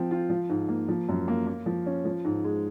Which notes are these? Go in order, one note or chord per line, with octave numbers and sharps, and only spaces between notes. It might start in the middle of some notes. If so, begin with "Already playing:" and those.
Already playing: F3 C4
F4
F3
G#2
A#3
F3
F#2
A#3
A#3
F3
C#4
F3
G#2
G#3